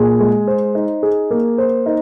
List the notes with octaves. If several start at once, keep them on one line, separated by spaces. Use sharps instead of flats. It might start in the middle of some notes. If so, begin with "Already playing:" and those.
Already playing: A#2 G#4
G#3
C5
D#4
G#4
A#3
C5
D#4